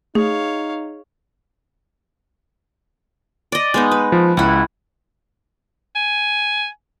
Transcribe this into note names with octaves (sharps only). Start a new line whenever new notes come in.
A3 D#4 G#4 C#5 F5
D5 D#5
G#3 B3 D#4
B4
F3
C#2 E4 F#5
G#5